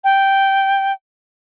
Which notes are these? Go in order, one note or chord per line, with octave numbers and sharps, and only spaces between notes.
G5